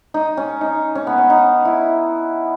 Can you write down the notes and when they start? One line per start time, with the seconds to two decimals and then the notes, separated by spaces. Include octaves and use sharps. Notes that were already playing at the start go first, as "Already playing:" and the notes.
0.14 D#4
0.37 C#4
0.61 D#4
0.95 C#4
1.07 B3
1.18 C#4
1.30 D#4
1.65 E4